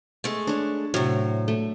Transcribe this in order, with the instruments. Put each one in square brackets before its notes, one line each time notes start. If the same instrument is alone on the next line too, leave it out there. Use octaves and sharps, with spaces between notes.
[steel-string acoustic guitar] G#3 A3
[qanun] D4 C#5
[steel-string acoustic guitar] A2 C3 [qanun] F#3
[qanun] A3